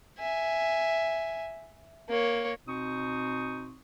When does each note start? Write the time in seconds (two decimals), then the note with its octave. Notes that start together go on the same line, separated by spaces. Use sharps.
0.19 E5 G#5
2.09 A#3 C#5
2.67 B2 C4 D#4 C#6 D#6